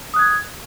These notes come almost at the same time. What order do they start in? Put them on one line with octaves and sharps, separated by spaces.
D#6 F#6 G#6